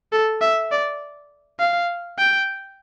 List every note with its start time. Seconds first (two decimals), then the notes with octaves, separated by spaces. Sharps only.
0.12 A4
0.41 E5
0.71 D5
1.60 F5
2.18 G5